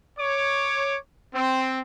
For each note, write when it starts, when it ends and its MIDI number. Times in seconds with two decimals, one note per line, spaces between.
0.20 0.98 73
0.20 0.98 86
1.34 1.81 60